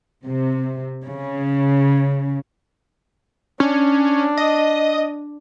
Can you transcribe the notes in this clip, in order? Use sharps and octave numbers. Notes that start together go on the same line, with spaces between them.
C3
C#3
C#4 D4
D#5